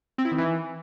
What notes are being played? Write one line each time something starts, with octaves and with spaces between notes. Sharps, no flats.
C4
E4
D#3
E3